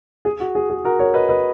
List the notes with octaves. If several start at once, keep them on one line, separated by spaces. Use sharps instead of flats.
G#4
F#4
G#4
G#4
F#4 A#4
A#4 C#5
B4 D#5
B4 D#5